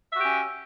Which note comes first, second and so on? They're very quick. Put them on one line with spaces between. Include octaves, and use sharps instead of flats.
E5 F#4 G4 C#4